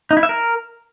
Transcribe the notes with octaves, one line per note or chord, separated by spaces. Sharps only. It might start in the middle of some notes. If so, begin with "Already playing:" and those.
D#4
E4
E5
A#4